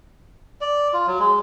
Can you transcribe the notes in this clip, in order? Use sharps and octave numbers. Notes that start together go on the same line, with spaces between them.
D5
F4
F#3
G#3